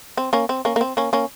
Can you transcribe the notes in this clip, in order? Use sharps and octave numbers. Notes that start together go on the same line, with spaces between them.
C4
A#3 C#4
C4
A#3 C#4
A#3
C4
A#3 C#4
A#3 C#4